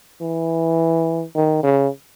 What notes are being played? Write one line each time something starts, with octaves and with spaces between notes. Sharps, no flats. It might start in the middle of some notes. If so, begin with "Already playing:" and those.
E3
D#3
C#3